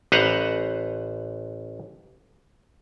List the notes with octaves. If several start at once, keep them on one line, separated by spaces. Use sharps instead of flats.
A1 B4 C5 F#5 A#5